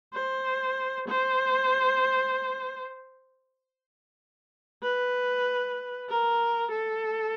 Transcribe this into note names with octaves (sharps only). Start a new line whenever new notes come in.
C5
C5
B4
A#4
A4